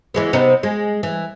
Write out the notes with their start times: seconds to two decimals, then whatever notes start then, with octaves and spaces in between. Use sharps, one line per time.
0.14 E3 G#3 B3
0.33 C3 B3 D#4
0.63 G#3
1.03 E3